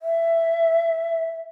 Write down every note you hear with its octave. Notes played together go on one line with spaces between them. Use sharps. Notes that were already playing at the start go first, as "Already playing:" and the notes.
E5